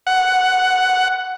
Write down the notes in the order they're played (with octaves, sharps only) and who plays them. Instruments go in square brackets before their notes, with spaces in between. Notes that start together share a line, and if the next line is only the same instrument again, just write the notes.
[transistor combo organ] F#5